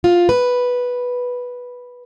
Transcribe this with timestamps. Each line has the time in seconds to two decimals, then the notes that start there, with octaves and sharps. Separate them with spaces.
0.04 F4
0.29 B4